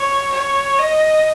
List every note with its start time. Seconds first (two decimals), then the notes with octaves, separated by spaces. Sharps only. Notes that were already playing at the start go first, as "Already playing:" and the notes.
Already playing: C#5
0.33 C#5
0.79 D#5